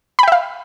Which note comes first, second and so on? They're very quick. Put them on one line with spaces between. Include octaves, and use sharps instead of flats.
B5 G5 E5 F5